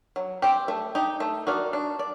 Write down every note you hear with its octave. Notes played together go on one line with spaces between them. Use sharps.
F#3
C4 G4
A3
D#4 G4
A3
D#4 F#4 A#4 D5
D4
D5